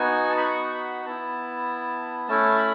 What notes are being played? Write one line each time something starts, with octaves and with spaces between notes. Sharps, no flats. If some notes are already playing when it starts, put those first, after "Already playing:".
Already playing: B3 D#4 F#4 G#5
A5
B5
C#6
B5
B3 E4 A5
A3 C#4 E4 A5
B5